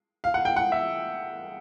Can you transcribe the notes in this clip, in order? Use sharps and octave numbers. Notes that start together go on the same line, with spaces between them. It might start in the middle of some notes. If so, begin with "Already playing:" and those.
F5
F#5
G5
F#5
E5